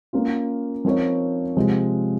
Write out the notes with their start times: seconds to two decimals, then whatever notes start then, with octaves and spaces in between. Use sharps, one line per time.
0.13 A#3 C#4 F4
0.85 F3 C4 D#4 A#4 C#5
1.57 C3 F3 G#3 C4